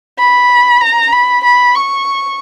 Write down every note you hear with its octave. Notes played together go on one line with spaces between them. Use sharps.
B5
A#5
B5
B5
C#6